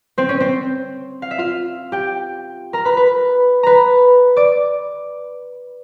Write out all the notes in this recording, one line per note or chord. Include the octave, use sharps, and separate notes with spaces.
C4 C5
C#4 C#5
C4 C5
F5
E5
F4 F5
G4 G5
A#4 A#5
B4 B5
B4 B5
B4 A#5 B5
D5 D6